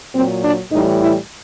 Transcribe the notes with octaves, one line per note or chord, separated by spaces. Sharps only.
A#2 F#3 C4
D4
A2 E3 G3 D#4
E4